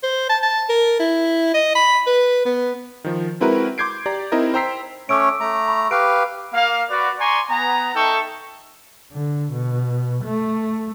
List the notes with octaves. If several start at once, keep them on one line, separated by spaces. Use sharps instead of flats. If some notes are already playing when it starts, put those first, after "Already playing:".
C5
A5
A5
A#4
E4
D#5
B5
B4
B3
D#3 F3
G#3 C4 E4 F#4 A#4 B4
C6 D6 G6 G#6 C7 D7
G4 D5 A#5 D6
C4 D#4 E4 A#4 D#5
C5 G5 A#5 E6 B6 C7
A3 C#4 C#5 D6 E6 D7
A3 A#5
B5 C#6
G4 B4 F5 D7
A#3 F5
F#4 B4 D5
D5 G#5 A#5 C6 C#6
B3 G#5 A#5
D#4 A4 E5 G5 A5 C#6
D3
B2
A3